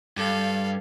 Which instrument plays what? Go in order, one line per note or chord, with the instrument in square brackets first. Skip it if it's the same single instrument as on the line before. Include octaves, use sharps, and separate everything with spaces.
[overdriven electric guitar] G2 [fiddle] A4 F5